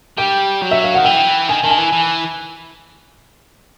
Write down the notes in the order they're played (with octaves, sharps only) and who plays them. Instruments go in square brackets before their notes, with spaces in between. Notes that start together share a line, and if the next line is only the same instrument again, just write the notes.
[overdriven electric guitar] G3 [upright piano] G5
[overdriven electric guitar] F#3
[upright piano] E5
F5
[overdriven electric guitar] D#3 [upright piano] F#5
[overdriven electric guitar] E3 [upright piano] G5
[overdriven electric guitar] D#3 [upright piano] G#5
[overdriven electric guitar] D#3 [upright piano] A5
[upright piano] G#5
[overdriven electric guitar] E3
E3